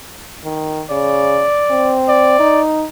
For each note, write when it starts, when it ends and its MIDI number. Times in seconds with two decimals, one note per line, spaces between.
0.44 0.83 51
0.91 1.45 49
0.91 1.96 74
1.71 2.38 60
2.09 2.61 74
2.40 2.85 63